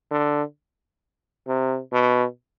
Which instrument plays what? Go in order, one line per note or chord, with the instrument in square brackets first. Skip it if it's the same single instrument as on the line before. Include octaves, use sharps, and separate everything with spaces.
[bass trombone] D3
C3
B2